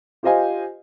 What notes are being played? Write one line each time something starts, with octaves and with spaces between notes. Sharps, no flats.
F4 G4 C5 D#5 F5 G#5